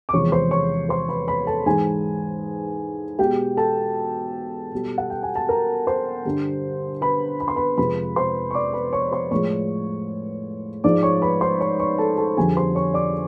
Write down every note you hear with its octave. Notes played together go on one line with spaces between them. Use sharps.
D6
E2 C3 F3 G#3 C#5 C#6
C5 C6
C#5 C#6
C5 C6
B4 B5
B4 B5
A4 A5
G#2 E3 G#3 G#4 G#5
B2 G#3 G4 G5
A4 A5
B2 G3
F#5
G5
G#5
A5
A#4 A#5
C5 C6
G2 D3 G3
B4 B5
B5
C6
B4 B5
F2 C3 F3 G#3 B4 B5
C5 C6
C#6
D5 D6
B4 B5
C#5 C#6
C5 C6
A2 F3 G#3 C#5 C#6
G#2 F3 G#3 D5 D6
C#5 C#6
B4 B5
C5 C6
C#5 C#6
C#5 C#6
A4 A5
A4 A5
F2 D3 G3 G#4 G#5
C5 C6
C#5 C#6
D5 D6